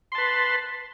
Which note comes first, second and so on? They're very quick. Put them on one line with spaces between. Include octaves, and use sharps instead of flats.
C6 A5 B4